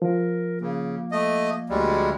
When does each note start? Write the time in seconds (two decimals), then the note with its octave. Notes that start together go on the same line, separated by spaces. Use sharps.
0.02 F3 A#4
0.61 C#3 A#3
1.12 A3 D#5
1.70 D2 G3 G#3